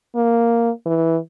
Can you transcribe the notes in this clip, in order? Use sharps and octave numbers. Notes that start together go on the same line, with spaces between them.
A#3
E3